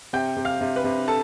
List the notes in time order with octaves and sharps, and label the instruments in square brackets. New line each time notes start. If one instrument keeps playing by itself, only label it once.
[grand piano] C3 G5 G6
C3
F5 F6
C3
B4 B5
C3
A4 A5